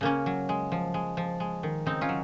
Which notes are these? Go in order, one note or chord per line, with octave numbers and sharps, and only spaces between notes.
C#3 A#3 C#4
F#3
G#3
F3
G#3
F3
G#3
D#3
C#3 C4 D#4
C#4 F4
F#3